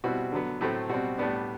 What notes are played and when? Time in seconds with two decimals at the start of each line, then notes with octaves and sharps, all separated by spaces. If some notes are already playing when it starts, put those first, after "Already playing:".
0.04 B2 G3 C4 E4 F#4
0.32 D3 F#3 B3
0.61 A2 F#3 A3 C4 E4
0.89 B2 G3 C4 F#4
1.18 A2 G3 B3 D4